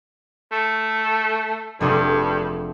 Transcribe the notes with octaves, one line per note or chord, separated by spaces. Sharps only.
A3
F1 G2 D4 G#4